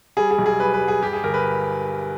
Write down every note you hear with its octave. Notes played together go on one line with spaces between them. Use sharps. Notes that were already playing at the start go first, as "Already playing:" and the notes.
G3 G#4
G#4
B1
G#4
G3 B4
B4
G3
G#4
G2 G4
G#4
G1 A#4
B4